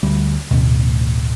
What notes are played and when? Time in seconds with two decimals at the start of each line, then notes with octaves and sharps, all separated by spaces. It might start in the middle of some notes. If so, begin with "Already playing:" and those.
0.03 D2 G3
0.51 A1 D2 B2